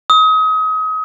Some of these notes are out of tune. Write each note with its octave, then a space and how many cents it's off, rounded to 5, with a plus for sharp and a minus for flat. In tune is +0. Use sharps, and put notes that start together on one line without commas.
D#6 +30